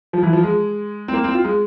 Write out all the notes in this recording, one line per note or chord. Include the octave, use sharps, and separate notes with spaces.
F3
E3
F3
G#3
C4
A#3
C4
F4
G#3